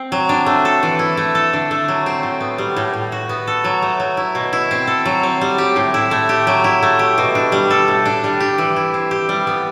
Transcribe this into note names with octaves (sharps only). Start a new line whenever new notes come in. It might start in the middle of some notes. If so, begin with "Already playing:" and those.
Already playing: C4
F#3
D4
A3
A4
E3
E4
A3
A4
D3
A3
F#3
C4
A2
B3
G3
A2
A2
F#4
B3
A4
F#3
A3
F#3
E4
B2
E4
C4
A4
F#3
C4
G3
G4
A2
E4
A3
G4
F#3
E4
A3
G4
B2
D4
G3
A4
A2
D4
G3
G4
E3
E4
C4
G4
G3
B3